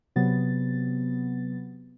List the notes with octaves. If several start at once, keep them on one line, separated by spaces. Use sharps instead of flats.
C3 F#3 B3 A6